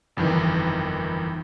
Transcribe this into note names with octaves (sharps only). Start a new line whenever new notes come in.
G1 F2 D#3 E3